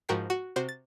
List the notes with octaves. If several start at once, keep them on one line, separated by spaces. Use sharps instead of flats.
G#2 F3 F#4 A#4 G5 C7
F#4
C3 F#4 C5
A6